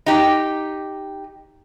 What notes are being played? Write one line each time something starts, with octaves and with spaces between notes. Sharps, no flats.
D#4 G4